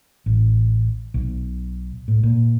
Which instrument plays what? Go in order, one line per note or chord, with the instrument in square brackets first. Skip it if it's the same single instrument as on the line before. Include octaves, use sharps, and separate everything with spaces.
[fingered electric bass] A1
B1
A2
A#2